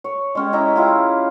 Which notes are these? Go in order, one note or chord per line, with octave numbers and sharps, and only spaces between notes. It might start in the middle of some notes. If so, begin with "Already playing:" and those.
C#5
G#3 C#4 G4
E4 D#5 E5 A#5
E4 F4 G4